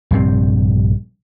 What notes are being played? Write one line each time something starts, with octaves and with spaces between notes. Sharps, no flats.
A#1 G2 C3 C4